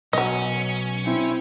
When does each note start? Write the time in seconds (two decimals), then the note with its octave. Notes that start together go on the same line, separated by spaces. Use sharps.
0.13 B1 F#3 C#4 D#5
1.05 C4 E4